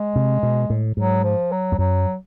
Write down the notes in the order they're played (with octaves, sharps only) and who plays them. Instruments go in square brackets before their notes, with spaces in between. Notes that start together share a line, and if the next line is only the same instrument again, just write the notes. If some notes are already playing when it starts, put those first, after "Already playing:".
Already playing: [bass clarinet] G#3
[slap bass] C3
B2
A2
[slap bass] G#2 [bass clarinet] F#3
[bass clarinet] F3
F#3
[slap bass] F2
[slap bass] F#2 [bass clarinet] F#3